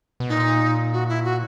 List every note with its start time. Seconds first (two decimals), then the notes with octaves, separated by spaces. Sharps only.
0.20 B2
0.29 A#2 D#4
0.93 F#4
1.09 E4
1.24 F#4